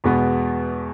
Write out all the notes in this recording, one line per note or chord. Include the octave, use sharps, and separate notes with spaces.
E2 B2 G#3 B3